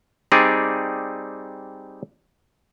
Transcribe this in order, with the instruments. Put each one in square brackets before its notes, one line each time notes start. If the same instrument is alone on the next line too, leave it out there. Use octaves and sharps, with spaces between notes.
[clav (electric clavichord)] G3 C4 D#4 G#4 D5